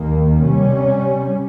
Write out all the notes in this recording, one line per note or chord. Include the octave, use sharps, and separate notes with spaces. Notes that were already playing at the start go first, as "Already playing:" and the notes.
Already playing: D#2 D#3 A#3
C3 G3 C#4